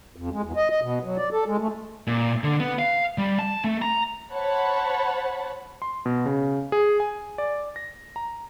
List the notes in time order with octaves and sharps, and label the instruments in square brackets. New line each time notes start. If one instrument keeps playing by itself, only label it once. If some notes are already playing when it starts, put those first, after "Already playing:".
[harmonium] F2
G#3
E2
D#5
D#5
B2
F#3
D5
A4
G#3
A3
[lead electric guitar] A#2
D3
B3
F5
G3
A5
A3
A#5
[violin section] C5 C#5 F#5 A5 B5
[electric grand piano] C6
B2
C#3
G#4
G#5
D5
A#6
A#5